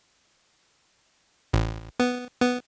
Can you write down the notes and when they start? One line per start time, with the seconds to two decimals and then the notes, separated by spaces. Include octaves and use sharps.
1.53 A1
1.99 B3
2.41 B3